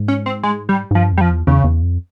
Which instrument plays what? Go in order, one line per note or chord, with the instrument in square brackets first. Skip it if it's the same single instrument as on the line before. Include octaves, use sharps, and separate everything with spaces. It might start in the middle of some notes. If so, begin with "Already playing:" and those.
Already playing: [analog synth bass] G#2
[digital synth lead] C#4
C4
G#3
G3
[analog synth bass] G#2
[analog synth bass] G2 [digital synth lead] F3
[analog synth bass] F2 [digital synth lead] G3
[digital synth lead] F3
[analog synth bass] E2
[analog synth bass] E2 [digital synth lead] C#3
[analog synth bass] E2
F2